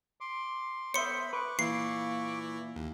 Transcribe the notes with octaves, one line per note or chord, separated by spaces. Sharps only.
C6 D6
B3 C5 C#5 E5 B5 C6 C#7
B4 C#6 D6
A#2 E3 E4 C7
D#2